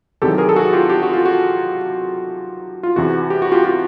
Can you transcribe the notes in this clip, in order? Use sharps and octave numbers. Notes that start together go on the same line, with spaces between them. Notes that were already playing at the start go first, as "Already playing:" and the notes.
E2 C3 D#3 F#3 G4 A4
G#4 A#4
A4
F#4 G#4
F4 G4
G4
F#4
F4
F#4
F4
E2 C3 E3 F#4
G4
F#4
F4 G4
F4 G4